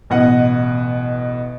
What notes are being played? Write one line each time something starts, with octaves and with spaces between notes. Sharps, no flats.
A1 B2 D#5 F#5